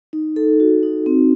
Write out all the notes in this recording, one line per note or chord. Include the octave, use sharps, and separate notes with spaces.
D#4
A4
F#4
D#4
C4